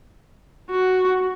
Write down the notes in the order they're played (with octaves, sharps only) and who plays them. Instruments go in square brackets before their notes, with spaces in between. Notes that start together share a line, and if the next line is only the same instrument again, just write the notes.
[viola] F#4